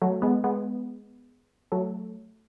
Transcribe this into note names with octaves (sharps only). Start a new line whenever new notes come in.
F#3 A3
G#3 B3
G#3 B3
F#3 A3